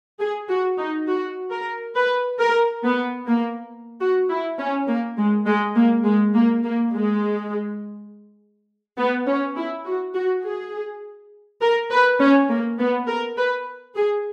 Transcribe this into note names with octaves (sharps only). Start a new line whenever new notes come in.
G#4
F#4
D#4
F#4
A#4
B4
A#4
B3
A#3
F#4
E4
C#4
A#3
G#3
G#3
A#3
G#3
A#3
A#3
G#3
B3
C#4
E4
F#4
F#4
G#4
A#4
B4
C#4
A#3
B3
A#4
B4
G#4